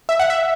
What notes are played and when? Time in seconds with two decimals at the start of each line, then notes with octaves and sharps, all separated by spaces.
0.09 E5
0.20 F#5
0.30 E5